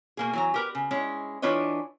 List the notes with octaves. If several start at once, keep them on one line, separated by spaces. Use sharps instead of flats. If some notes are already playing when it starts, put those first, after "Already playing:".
B2 A#3 G#4
E3 F#3 A#5
G4 A#4 B4
C#3
G#3 C#4 E4
E3 D4 F4 B4 C#5 D#5